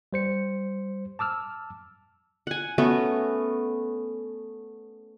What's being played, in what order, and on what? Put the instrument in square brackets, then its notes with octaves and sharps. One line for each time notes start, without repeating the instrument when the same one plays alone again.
[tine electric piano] G3 C5 C#7
A5 D6 E6 F6
[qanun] F#5 G#5
A3 B3 C#4 F#4